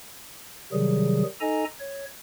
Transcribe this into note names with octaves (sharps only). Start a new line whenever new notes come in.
C3 D#3 F#3 G3 G#4
D#4 A4 D#5 G#5 A#5
C#5